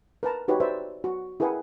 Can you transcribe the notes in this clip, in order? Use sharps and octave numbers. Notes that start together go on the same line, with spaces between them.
A#4 B4 A5 A#5
D#4 F#4 G4 B4 C#5
B4 C5 D5 E5
F#4
E4 G#4 A#4 B4 F#5 G5